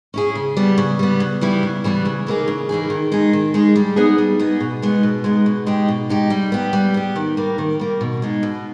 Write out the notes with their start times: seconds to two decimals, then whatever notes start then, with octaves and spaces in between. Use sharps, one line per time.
0.14 C#4 E4 G#4
0.35 C#3
0.57 G3 B3
0.78 C#3
0.99 G3 B3
1.20 C#3
1.41 E3 G3 B3 E4
1.63 C#3
1.84 E3 G3 B3 E4
2.05 C#3
2.27 E3 A#3 D#4 G#4
2.48 C#3
2.69 E3 A#3 D#4 G#4
2.90 D#3
3.12 G#3 D#4 G#4
3.33 D#3
3.54 G#3 D#4 G#4
3.76 G3
3.96 B3 D#4 G#4
4.18 G3
4.39 B3 D#4 G#4
4.60 B2
4.82 G#3 B3 D#4
5.03 B2
5.24 G#3 B3 D#4
5.46 B2
5.67 G#3 D#4 G4
5.88 B2
6.09 G#3 D#4 G4
6.30 G3
6.52 B3 G4
6.73 G3
6.94 B3 G4
7.16 D#3
7.37 G3 A#3
7.58 D#3
7.79 G3 A#3
8.01 B2
8.22 G#3 D#4 G#4
8.43 B2